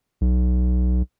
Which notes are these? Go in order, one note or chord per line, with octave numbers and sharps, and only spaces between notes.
B1